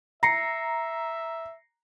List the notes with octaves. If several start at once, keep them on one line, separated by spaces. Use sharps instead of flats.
E5 A#5 A#6 C7 C#7